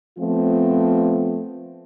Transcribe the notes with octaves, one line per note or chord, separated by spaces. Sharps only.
F3 A3 B3 C4 F4